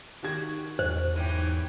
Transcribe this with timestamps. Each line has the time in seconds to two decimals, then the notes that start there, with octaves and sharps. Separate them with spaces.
0.23 D#3 F#4 G4 G#6
0.79 E2 C5
1.16 G#2 E3 F#3 G4